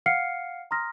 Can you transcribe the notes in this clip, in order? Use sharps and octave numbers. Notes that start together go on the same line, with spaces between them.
F5 F#5 F6 C7 C#7
A#5 C6 D#6 F6 A#6